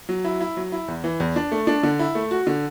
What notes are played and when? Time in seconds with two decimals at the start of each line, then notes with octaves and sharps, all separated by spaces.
0.09 F#3
0.25 E4
0.41 E4
0.57 F#3
0.72 E4
0.88 E2
1.04 E3
1.20 E2
1.36 D4
1.52 A3
1.67 D4
1.83 D3
1.99 E4
2.15 A3
2.31 F#4
2.47 D3